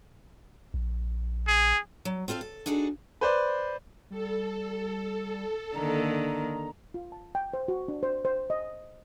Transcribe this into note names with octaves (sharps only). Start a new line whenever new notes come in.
A#1
G#4
F#3
C4 F4 A4 E5 F5
A4
D4 D#4 F#4 G#4 A4
B4 C5 D5
G3 A4
D3 D#3 A#3 A#5
F4
A5
G5
C5
F#4
D4
C5
C5
D#5